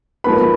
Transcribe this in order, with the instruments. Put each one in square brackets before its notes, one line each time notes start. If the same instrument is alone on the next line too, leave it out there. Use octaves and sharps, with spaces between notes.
[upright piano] G#2 F3 A#3 B4 B5